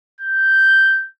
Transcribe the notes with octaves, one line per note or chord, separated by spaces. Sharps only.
G6